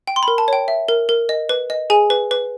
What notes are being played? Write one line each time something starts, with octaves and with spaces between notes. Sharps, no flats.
G5
C6
A#4 B5
A5
C#5 G5
E5
A#4
A#4
D#5
B4
D#5
G#4 G#5
B4
B4